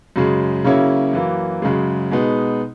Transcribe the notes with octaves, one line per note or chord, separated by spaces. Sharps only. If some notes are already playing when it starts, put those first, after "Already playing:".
F#2 C#3 G#3
C#3 F#3 A#3 C#4 E4
F#2 E3 A#3
F#2 C#3 G#3
B2 G#3 B3 D#4